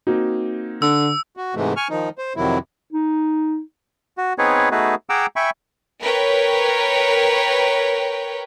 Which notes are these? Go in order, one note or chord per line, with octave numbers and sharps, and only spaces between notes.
A#3 C4 D#4 F#4
D3 E6
F#4
G#2 C3 E3 G#3 A3
G#5 C#6 F6
D#3 F3 D#4
C5
F2 C3 D#3 F#3 E4
D#4
F#4
B3 C4 D#4 G#4 B4 C#5
A3 B3 D#4 F#4 G#4 B4
G#4 F#5 G5 A#5 D6 E6
E5 G5 G#5 B5 C#6
A#4 B4 C#5 G5